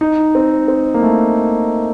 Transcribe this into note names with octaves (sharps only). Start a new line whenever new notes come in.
D#4
C4
C4
A#3
A3